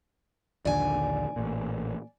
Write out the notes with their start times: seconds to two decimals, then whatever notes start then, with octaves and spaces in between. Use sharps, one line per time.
0.65 A#1 D#2 D3 D5 G#5
1.36 A1 A#2